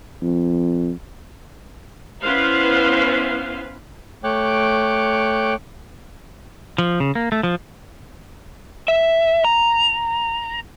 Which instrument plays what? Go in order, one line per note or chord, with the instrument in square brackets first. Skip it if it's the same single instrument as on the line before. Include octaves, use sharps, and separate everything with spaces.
[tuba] F2
[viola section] B3 C#4 E4 B4 C5 F5
[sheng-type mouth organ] A3 C#5 G5 D6 F#6
[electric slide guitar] F3
C#3
A#3
A3
F3
E5
A#5